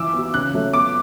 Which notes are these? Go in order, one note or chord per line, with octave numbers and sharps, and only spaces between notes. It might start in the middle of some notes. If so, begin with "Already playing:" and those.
Already playing: E3 D6 E6
B3 F#4
C#3 F#6
F#3 A3
B3 D6